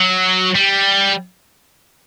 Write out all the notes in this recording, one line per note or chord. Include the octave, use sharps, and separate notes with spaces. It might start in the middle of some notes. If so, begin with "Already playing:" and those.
Already playing: F#3
G3